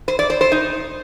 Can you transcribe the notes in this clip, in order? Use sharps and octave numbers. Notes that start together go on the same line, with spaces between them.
C5
D5
C5
C5
D#4